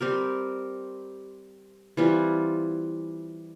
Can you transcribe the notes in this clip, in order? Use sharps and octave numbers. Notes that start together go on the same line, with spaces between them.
G3 C4 G4 A#4
E3 G3 C4 F4